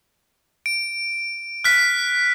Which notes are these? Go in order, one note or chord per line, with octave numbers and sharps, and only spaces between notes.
D7
F6 F#6 B6